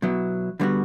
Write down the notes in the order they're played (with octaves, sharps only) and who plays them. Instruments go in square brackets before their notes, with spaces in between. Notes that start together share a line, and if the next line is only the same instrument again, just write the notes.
[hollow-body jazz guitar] B2 F#3 B3 E4
D3 G3 B3 F#4